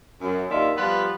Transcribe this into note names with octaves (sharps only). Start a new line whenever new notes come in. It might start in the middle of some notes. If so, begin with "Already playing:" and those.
F#2
D#2 D#3 D4 F4 E5
F3 G3 B3 F4 B4